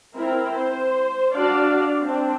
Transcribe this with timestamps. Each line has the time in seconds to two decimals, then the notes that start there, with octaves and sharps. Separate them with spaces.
0.15 C4 E4 A#4
0.53 C5
1.35 D4 F#4 D5 F5
2.02 C4 D4